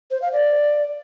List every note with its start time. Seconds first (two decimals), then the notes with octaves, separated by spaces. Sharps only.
0.11 C5
0.22 F5
0.33 D5